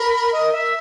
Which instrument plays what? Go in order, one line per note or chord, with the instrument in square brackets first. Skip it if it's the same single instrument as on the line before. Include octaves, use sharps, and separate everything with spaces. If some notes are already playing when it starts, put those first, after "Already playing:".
Already playing: [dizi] A#4 [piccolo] B5
[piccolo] D#5
E5